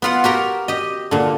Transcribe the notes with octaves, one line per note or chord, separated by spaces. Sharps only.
B3 F4 F#5
F#4 G4 A#4 G5
G4 D#5
A#2 D3